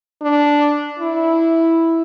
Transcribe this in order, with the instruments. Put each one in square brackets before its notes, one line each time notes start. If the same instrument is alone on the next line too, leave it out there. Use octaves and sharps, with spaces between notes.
[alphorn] D4
E4